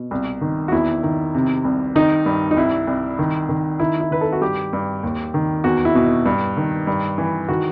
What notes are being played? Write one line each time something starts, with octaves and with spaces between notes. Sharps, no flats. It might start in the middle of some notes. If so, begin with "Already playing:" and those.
Already playing: B2
C2
D#3
F#4
E2 E4
D#3
C3
C2
D#3 D#4
G2
D#4
C2 E4
C2
D#3
D#3
D#3 E4
E4
D#3 B4
A4
F#4
G2 G4
G2
D#2
D#3
E2 F#4
E4
B2
G2
D#3
G2
E3
D#3 F#4